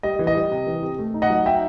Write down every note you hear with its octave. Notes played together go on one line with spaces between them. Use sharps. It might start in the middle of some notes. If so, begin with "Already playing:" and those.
G3 D#5
E3
D#5
G3
C3
E3
C3
A3
D#4
D#5 F#5
F#3
D#4 E5 G5